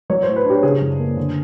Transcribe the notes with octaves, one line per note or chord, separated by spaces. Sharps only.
F#3 C#5
A2 C5
B4
D4 G4
C#3 G#4
F#2
A#3
D3